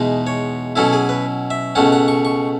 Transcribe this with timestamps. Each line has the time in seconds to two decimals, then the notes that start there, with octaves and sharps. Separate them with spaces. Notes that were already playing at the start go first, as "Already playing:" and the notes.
Already playing: E2 B2 G#3 D#4
0.27 C#5
0.76 B2 F#3 C#4 E4 A4
0.93 G#4
1.09 B4
1.50 E5
1.75 C#2 B2 A3 C#4 F#5
1.92 F#5
2.08 C#6
2.25 C#6